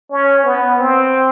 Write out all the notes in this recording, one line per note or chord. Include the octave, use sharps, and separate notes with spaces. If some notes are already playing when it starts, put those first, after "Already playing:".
C#4
B3
C4